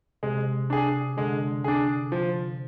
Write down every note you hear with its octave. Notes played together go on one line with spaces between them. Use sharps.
C3 G#3
D4 G#4
D3 G#3
D4 G#4
F3